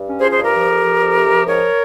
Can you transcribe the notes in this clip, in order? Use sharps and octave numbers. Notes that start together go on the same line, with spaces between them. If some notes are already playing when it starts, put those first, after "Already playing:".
Already playing: G2
C#4
G#4 C5
F3
G#4 C5
G2 G4 A#4
F3
F2
F3
F2
C3
F3
G#2 A#4 C#5